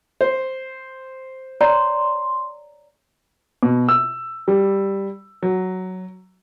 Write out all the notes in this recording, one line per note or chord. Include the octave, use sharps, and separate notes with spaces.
C5
C#5 D5 A#5 C6
B2
E6
G3
F#3